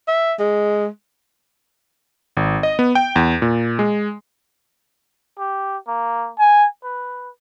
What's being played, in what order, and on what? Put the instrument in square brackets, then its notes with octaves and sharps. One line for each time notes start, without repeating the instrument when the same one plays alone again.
[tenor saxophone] E5
G#3
[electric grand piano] G#1
D#5
B3
G5
E2
A#2
G#3
[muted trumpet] G4
A#3
G#5
B4